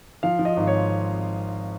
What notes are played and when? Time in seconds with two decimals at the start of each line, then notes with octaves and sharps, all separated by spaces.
0.23 F3 F5
0.39 F3
0.45 D#5
0.57 G#1
0.67 C#5